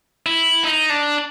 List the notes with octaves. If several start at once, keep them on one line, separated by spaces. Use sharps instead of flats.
E4
D#4
D4